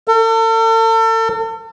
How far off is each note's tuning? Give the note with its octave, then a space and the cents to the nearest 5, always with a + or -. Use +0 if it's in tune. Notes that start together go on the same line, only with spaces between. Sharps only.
A4 +40